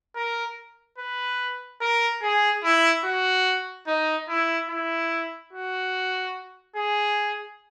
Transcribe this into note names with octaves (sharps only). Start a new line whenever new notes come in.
A#4
B4
A#4
G#4
E4
F#4
D#4
E4
E4
F#4
G#4